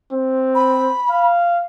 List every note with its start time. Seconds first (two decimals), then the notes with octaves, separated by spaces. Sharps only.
0.12 C4
0.55 B5
1.10 F5